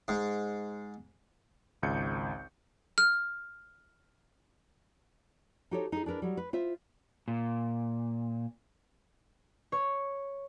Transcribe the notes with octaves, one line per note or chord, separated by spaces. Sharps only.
G#2
G#1 C#2 G6 C#7
F6
D#4 F#4 G4 A4 C5 C#5
D#4 G#4
D4 G#4 A#4 B4
F#3 G3
B4
F4 C5 E5
A#2
C#5